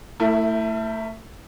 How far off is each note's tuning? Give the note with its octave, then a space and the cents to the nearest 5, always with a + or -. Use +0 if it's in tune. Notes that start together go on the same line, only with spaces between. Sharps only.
A3 +25 E4 +0 A#4 -30